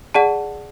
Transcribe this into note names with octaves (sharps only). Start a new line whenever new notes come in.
G#4 D5 F#5 A5